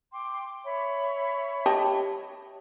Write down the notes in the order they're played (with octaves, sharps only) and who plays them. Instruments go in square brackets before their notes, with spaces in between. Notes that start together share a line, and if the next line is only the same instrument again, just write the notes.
[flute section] G5 C6 D6
C#5 E5 B5
[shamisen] G4 D#5 A5